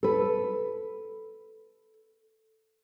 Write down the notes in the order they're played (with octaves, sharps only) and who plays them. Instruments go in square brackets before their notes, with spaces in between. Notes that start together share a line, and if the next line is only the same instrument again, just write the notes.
[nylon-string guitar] A4 B4